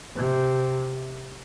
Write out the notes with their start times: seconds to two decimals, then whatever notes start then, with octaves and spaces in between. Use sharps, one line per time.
0.16 C3